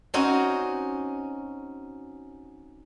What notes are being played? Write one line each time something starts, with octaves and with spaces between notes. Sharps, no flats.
C4 C#4 D#4 F#4